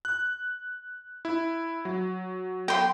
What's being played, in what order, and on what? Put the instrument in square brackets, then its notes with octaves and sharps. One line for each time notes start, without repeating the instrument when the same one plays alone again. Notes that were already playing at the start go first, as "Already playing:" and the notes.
[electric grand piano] F#6
E4
F#3
[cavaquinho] G5 C6